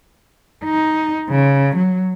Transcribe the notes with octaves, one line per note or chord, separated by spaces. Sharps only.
D#4
C#3
F#3